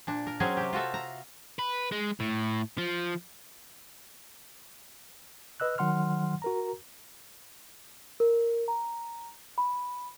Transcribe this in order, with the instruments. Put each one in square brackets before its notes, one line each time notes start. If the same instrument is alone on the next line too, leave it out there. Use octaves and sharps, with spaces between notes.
[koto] A#2 D4
A#4
F#3 C4 C#4 G#4 C5
C3 G4
F4 F#4 A4 E5
A#5
[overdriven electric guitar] B4
G#3
A2
F3
[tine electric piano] B4 D#5 E6 F#6
D#3 F#3 F#5 C6 F6
F#4 A#4 A#5
[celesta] A#4
A#5
B5